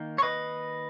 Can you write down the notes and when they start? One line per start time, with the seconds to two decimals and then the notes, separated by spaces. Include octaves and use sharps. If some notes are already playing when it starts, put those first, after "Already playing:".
Already playing: D#3 A#3 D#4
0.18 C#5
0.22 B4 D#5